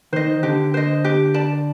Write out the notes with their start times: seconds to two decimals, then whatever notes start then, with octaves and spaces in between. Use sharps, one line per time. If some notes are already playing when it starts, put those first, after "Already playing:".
0.13 D#3 C5 D#5
0.43 D3 G4
0.74 C5 D#5
1.05 G4
1.34 D5 A5